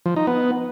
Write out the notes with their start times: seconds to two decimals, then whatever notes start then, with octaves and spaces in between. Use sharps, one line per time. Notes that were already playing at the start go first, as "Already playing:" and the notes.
0.06 F3
0.16 D#4
0.27 B3